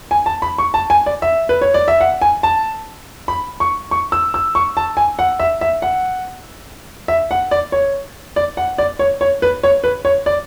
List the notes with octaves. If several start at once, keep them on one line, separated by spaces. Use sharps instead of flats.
G#5
A5
B5
C#6
A5
G#5
D5
E5
B4
C#5
D5
E5
F#5
G#5
A5
B5
C#6
C#6
E6
E6
C#6
A5
G#5
F#5
E5
E5
F#5
E5
F#5
D5
C#5
D5
F#5
D5
C#5
C#5
B4
C#5
B4
C#5
D5